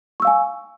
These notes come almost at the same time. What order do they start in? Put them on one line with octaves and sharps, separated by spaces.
C#6 E6 F5 G#5